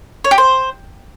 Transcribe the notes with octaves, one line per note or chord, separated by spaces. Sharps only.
C#5
G4
C5